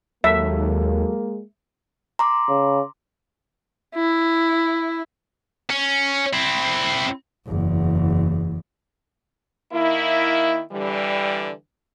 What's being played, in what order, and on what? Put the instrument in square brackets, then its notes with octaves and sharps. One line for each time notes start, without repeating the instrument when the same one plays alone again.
[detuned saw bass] D#2 [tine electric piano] F#3 F#4 A4 [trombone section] G#3 A#3 [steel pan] E5
[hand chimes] A#5 C6 D6
[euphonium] C#3
[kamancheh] E4
[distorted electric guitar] C#4
C4 E4
[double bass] F#1 E2
[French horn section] D#3 A#3 E4
D3 E3 G3